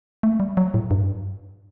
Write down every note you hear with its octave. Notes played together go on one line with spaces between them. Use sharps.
A3
G3
F#3
A2
G2